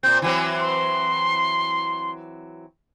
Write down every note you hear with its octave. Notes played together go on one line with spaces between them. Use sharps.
A#2 C4 G6
E3 F#3 C4 G#5
C6